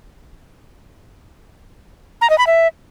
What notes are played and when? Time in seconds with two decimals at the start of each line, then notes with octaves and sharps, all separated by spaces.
2.21 A#5
2.30 D#5
2.38 B5
2.47 E5